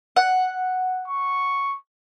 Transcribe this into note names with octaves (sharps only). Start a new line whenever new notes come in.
F#5
C#6